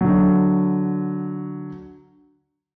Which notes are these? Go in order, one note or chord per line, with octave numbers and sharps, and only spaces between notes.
D3 F#3